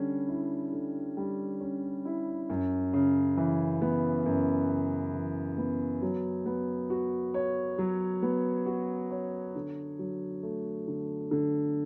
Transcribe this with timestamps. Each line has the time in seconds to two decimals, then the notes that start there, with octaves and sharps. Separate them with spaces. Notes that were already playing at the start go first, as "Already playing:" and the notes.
Already playing: D3 G3 C#4
0.28 E4
0.73 D3
1.17 G3
1.61 C#4
2.05 E4
2.50 F#2
2.93 C#3
3.37 E3
3.82 B3
4.26 F#2
4.69 C#3
5.14 E3
5.58 B3
6.02 F#3
6.46 B3
6.90 F#4
7.34 C#5
7.78 F#3
8.22 B3
8.66 F#4
9.11 C#5
9.55 D3
9.99 F#3
10.43 A3
10.88 D3
11.31 D3